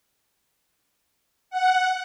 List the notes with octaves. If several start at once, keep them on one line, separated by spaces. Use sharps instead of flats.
F#5